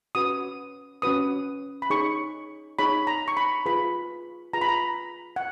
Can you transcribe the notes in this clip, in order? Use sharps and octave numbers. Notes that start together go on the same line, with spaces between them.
C#4 F#4 B4 D#6
C#4 F#4 B4 D#6
B5
D#4 G#4 C#5 C#6
D#4 G#4 C#5 B5
A#5
C#6
B5
F4 G#4 B4 B5
F4 G#4 B4 A#5
B5
A#5
F#5